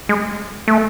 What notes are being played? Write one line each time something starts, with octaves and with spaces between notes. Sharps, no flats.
G#3
A3